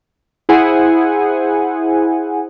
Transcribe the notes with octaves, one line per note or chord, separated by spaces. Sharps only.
E4 G#4 C5 F#5 G#5